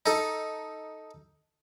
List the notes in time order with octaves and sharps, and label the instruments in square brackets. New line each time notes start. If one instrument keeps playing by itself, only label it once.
[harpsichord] D#4 A4